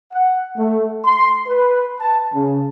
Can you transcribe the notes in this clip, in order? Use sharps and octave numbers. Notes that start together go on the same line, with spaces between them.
F#5
A3
C6
B4
A5
C#3